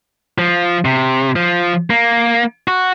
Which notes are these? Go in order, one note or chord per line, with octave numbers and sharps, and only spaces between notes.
F3
C3
F3
A#3
F#4